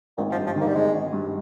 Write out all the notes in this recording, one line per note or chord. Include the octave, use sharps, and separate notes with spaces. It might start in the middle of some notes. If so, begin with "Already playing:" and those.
G#1 A#2
F3
G2
F3
D#3
A#3
G3
G#1 G#3
G#1
G2